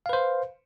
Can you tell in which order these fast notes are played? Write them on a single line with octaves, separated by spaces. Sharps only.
F5 B4 C5